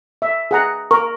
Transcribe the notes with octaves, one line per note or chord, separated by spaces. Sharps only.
E5
G#4 F#5 A#5
A#4 C#6